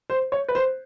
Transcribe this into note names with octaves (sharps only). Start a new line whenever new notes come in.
C5
C#5
B4
C5